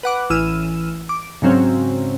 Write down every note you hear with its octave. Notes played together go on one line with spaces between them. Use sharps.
B4 F#5 D6
A1 E3 E6 F6 D#7
D6
G#2 C#3 F#3 C4 C#4